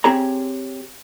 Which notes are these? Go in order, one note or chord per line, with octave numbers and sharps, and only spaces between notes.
C4 G4 G#4 C#5 A#5